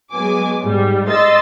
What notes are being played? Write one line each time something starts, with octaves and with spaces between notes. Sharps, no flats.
F#3 G#3 B3 G#5 D6
G#2 G3
D#5 C6 E6 A6